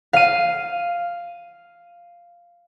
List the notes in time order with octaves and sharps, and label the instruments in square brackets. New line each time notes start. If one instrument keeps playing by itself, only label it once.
[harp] F5 D#7